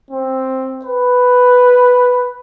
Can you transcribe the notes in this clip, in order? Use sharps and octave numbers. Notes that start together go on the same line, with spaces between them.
C4
B4